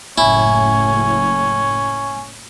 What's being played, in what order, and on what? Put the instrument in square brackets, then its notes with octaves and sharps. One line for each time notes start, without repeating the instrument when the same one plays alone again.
[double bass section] F#1 A2 [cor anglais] C#4 [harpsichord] E4 [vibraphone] G#5